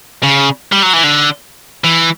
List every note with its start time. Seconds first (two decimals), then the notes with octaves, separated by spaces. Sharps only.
0.23 C#3
0.72 G3
0.82 F#3
0.93 E3
1.04 D3
1.84 E3